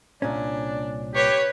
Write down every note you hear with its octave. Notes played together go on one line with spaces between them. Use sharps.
C2 A#2 C#4 D4
G4 B4 C#5